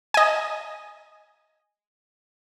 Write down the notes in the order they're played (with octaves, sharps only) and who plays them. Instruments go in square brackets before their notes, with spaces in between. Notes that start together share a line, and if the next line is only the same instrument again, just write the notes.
[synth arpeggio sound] D#5 G#5